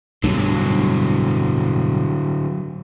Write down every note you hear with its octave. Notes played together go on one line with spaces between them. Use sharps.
B1 G2 D3 F#3 A3